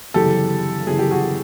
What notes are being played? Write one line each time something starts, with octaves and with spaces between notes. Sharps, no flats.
G1 F#2 C#3 E3 G4 A4
G1 F#2 C#3 E3 G#4
G4
F#4 G#4